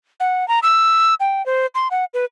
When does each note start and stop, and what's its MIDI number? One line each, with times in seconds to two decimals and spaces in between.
0.20 0.47 78
0.48 0.59 82
0.63 1.14 88
1.20 1.44 79
1.46 1.66 72
1.75 1.88 84
1.91 2.05 78
2.14 2.25 71